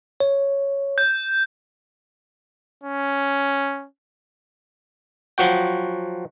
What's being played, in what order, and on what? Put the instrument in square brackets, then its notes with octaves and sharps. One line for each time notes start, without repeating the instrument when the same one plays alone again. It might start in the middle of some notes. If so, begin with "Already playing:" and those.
[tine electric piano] C#5
[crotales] G6
[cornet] C#4
[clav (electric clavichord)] F3 F#3 F#4 G5